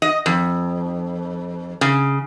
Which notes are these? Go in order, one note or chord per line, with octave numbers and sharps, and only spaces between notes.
D#5
F2
C#3